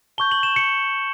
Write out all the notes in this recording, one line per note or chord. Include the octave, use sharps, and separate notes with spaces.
A5 C#6 G6 G7
F#7
E7
C#7